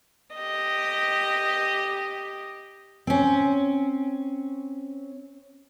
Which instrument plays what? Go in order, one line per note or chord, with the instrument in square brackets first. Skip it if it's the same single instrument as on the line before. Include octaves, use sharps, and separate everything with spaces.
[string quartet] G4 D#5
[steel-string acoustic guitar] C4 C#4